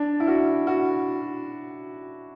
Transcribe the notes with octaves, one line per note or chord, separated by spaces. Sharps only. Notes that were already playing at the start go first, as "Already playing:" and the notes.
Already playing: D4
E4
F#4
F#4